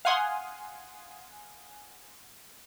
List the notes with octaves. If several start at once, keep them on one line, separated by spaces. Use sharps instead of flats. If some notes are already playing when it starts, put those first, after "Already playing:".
F5 F#5 G#5 C6 D#6